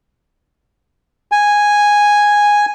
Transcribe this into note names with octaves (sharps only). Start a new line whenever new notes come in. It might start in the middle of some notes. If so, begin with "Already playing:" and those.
G#5